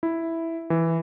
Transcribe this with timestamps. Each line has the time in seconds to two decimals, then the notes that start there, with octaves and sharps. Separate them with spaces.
0.03 E4
0.70 E3